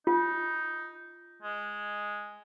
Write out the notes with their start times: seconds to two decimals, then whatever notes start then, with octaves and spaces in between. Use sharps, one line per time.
0.07 D#4 F4
1.42 G#3